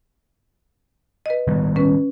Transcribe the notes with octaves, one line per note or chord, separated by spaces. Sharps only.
B4 D#5
D#3 G3 B3
C#4 B4